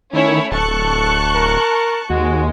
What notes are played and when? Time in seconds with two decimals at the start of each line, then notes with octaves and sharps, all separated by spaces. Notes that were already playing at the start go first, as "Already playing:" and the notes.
0.14 D#3 A3 C#4 E4 C#5
0.52 D1 A4 A5 C#6 F#6
1.35 A#4
2.10 D#2 G#3 F#4